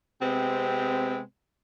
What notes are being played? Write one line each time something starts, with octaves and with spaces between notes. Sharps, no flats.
C3 G#3 B3 C4